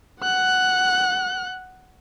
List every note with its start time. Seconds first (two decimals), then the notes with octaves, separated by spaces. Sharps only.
0.22 F#5 F#6